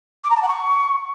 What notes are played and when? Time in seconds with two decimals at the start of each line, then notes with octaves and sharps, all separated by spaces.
0.24 D6
0.30 A#5
0.36 A5
0.42 F#5
0.48 C#6